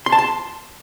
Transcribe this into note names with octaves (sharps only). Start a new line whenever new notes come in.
C6
A5
C6